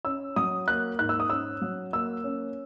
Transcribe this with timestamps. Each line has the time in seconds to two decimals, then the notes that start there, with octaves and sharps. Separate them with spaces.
0.05 C#4 E6
0.36 F#3 D#6
0.68 A#3 F#6
0.99 G#2 F#6
1.09 E6
1.20 D#6
1.30 C#4 E6
1.61 F#3
1.93 A#3 E6
2.24 C#4